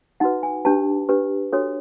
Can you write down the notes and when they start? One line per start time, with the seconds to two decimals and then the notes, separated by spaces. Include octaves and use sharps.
0.20 D#4 F#4 B4 F#5
0.43 G#5
0.65 D4 G4 B4 A5
1.09 D4 G4 B4
1.53 D4 F#4 A4 C#5